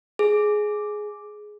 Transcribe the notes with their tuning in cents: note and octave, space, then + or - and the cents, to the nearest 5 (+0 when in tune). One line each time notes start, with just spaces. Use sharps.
G#4 +10